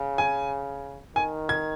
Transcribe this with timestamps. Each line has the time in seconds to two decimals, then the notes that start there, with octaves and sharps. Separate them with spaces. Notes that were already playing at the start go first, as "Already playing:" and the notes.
Already playing: C#3
0.18 G#5
1.16 D#3 G#5
1.49 G#6